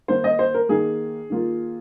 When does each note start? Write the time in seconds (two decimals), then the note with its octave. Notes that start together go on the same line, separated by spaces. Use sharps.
0.08 D#3 A#3 D#4 C5
0.24 D#5
0.39 C5
0.54 A#4
0.69 D#3 A#3 D#4 G#4
1.30 D#3 A#3 F4